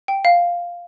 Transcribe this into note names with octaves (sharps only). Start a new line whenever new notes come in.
G5
F5